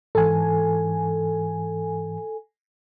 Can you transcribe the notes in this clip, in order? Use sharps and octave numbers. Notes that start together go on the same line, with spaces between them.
G#2 E3 A4 G#5